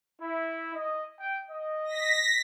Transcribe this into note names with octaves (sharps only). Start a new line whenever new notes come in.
E4
D#5
G5
D#5
A#6 B6